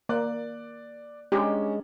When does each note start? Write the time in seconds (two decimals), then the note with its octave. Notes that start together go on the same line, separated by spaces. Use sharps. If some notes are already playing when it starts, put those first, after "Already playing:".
0.09 A#3 D5 F#6
1.32 G#3 C#4 D4 G4 A#5